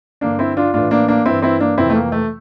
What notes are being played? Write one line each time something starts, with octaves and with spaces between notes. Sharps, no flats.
G2 D3 A#3 D4
C4 E4
D4 F4
A2 E3 D4 F4
A#3 D4
A#3 D4
G2 E3 C4 E4
C4 E4
A#3 D4
F2 C3 E3 C4 E4
A3
A#3
A3